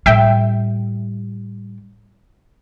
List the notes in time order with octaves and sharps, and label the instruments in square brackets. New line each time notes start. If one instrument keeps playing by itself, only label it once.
[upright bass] A2 G3 [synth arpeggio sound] E5 G5